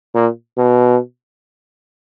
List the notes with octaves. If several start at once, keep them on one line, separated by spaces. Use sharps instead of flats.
A#2
B2